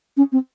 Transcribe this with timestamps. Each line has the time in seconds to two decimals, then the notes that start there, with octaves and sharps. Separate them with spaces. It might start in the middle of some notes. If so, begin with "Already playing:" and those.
0.17 C#4
0.32 C4